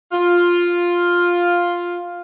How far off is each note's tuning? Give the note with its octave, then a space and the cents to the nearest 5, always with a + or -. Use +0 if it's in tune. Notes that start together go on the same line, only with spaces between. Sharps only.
F4 +5